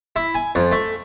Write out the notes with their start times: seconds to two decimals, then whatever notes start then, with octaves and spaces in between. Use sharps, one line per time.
0.16 E4
0.35 G#5
0.55 F2
0.72 A3